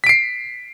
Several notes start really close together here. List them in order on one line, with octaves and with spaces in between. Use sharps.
B6 D7 C7